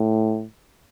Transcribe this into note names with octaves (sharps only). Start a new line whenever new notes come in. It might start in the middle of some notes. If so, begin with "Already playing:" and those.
Already playing: A2